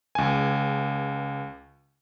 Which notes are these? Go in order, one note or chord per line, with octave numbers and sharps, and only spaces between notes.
C#2 G#5